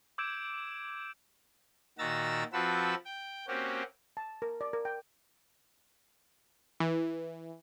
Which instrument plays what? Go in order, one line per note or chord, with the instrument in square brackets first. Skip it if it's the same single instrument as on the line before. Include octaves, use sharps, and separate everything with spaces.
[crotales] D6 E6 G6 G#6 D7 E7
[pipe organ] A#2 D#3 F#4 A#5 E6 A6
F3 C4 F#4 A4 B4 E6
G5
A#3 C4 C#4 F#4 G4
[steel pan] A5
A#4
D5
A#4
G5
[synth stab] E3